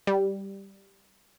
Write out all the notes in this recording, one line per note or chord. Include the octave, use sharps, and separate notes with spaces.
G3